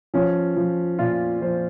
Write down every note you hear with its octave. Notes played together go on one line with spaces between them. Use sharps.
F3 C#4
F3
A#2 F4
F3 C5